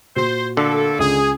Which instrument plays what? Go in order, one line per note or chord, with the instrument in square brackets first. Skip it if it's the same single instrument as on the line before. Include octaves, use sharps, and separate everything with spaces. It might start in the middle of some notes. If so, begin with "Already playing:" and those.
[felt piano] A#2 F#4 [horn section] C5
[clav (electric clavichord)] D3 [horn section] A3 A#3 A4
[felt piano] C#2 [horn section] G#4